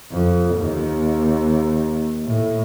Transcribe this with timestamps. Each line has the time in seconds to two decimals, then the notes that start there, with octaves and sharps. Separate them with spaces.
0.12 F2
0.56 D#2
2.25 A2